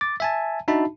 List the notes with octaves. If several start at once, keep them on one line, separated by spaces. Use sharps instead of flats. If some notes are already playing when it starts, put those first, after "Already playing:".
D6 A6
E5 G#5 A5
D4 D#4 F#4 E5 A5 B5